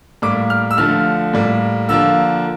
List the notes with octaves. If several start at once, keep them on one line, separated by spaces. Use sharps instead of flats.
A2 G3 A#3 D6
F6
E6
D3 F3 A3 F6
A2 G3 A#3
D3 F3 A#3 E6